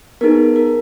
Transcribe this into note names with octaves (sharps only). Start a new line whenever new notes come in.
B3 D#4 G#4 A#4
A#4